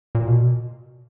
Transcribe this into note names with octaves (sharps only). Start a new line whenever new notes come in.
A#2
B2